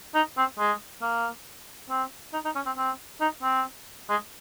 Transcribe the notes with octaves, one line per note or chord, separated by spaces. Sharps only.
D#4
C4
G#3
A#3
C4
D#4
D#4
C#4
C4
C4
D#4
C4
G#3